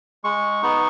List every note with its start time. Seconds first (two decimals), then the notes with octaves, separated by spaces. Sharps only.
0.24 G#3 C#6
0.62 B3 D#4